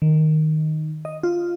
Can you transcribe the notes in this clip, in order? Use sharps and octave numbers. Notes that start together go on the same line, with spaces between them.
D#3
D#5
F4